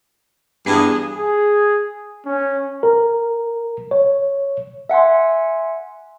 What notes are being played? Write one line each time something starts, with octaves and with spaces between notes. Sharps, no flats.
E2 G2 G#4
G#4
C#4
A#4
C#5
E5 F#5 G#5 C6